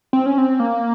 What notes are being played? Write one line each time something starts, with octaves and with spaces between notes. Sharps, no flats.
C4
C#4
C4
A#3